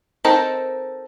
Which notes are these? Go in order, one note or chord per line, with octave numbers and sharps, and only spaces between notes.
C4 D#4 A4 A#4